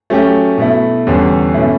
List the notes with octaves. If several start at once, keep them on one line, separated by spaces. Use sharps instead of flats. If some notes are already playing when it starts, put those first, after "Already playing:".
F#3 A3 C#4 G4
B2 A3 E4
E2 D3 G3 C#4
B2 A3 C#4 E4